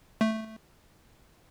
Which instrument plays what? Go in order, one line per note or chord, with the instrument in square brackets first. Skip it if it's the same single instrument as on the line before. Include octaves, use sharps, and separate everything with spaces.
[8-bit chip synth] A3